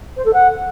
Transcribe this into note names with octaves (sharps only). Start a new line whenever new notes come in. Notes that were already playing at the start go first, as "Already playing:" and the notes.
C5
A4
F#5